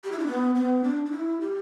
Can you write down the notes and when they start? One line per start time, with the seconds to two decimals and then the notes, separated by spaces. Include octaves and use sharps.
0.04 G4
0.12 E4
0.19 D4
0.26 B3
0.55 B3
0.84 D4
1.06 D4
1.12 E4
1.41 G4